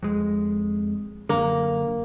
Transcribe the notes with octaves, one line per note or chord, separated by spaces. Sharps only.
F2 G#3
F#2 D3 A#3